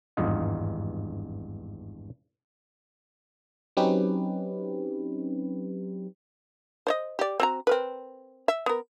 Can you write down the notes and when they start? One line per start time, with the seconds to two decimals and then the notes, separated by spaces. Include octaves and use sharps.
0.17 G#1 E2 G2 D#4 F4 D#5
3.77 F#3 C4 C#4 D#4 G4 B4
6.87 C5 C#5 D#5
7.19 G4 D5
7.40 C4 F#4 A#5
7.67 C4 A#4 B4
8.48 E5
8.66 B3 A#4